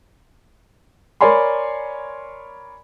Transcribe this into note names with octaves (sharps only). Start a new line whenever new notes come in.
A#4 C#5 D5 G#5 B5 C6